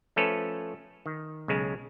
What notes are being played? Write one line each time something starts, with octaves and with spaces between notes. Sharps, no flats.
F3 A3 C#4 A4 B4 C#5
D#3
B1 C#3 G#3